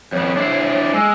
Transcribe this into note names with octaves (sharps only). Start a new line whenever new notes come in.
F2 B3 C#5
D4 E4 C5
G#3 E6